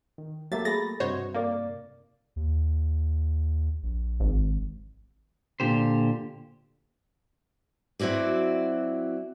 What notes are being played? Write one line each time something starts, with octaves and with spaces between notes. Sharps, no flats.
D#3
F#3 A3 A#3 G4 E5 F5 A6
G#4 A#5 B5 A6 A#6
G2 C3 F#4 C5 C#5 D#5
A#3 D#4 A#4 D5
D#2
A#1
G#1
A#2 D3 G4 C5
F#3 C4 E4 F#4 D5